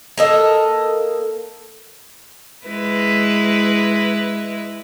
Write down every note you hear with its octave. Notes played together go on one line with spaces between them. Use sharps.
A#3 A4 D#5
G#3 E4 B4